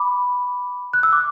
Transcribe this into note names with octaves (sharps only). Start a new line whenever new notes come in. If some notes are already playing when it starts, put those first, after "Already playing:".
Already playing: B5 D6
F#6
E6
D6